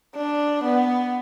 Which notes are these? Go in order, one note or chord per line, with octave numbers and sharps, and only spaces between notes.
D4
B3